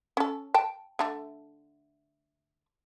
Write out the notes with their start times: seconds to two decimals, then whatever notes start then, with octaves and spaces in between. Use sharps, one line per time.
0.17 C#4 A4
0.54 G5 A5
0.99 D3 A3